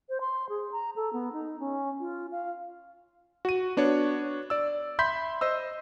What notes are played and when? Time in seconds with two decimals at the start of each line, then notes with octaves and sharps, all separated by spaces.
0.09 C5
0.21 C6
0.49 G#4
0.72 A#5
0.96 A4
1.13 B3
1.33 D#4
1.60 C#4
2.00 F4
2.32 F5
3.45 F#4 D#7
3.77 B3 D4 F#4 C#5
4.50 D5 E6
4.99 E5 B5 C6 G6 B6
5.41 C5 D#5 E6